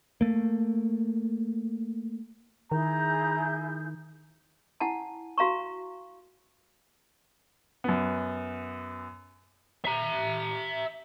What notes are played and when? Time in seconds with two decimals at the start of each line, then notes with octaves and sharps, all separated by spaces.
0.21 A3 A#3
2.72 D#3 E4 G#4 A#5 G6
4.80 E4 F#5 G#5 A5
5.38 F#4 F5 A#5 C#6
7.84 F#2 B3
9.84 E5 A#5